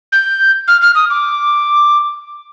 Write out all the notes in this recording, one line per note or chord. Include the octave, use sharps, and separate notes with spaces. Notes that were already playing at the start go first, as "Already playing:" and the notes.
G6
F6
F6
D#6
D6